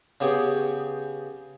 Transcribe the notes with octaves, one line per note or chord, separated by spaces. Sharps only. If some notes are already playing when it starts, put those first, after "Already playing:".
C#3 B3 G4 G#4 G5 C#6